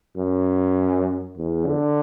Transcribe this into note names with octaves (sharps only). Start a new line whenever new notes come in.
F#2
E2
D3